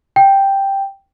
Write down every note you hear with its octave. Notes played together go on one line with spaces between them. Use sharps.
G5